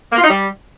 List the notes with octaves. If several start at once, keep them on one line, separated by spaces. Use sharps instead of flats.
A#3
F4
D#4
G3